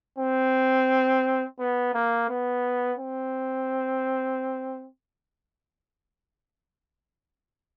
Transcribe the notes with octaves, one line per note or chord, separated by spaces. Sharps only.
C4
B3
A#3
B3
C4